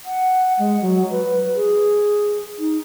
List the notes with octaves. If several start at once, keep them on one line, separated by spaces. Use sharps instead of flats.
F#5
G#3
F#3
B4
G#4
D#4